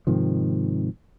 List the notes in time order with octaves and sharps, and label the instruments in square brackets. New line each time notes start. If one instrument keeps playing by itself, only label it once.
[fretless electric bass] G#2 C3 D#3 F3